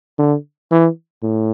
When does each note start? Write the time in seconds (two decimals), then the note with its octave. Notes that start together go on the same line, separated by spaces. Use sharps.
0.19 D3
0.72 E3
1.23 A2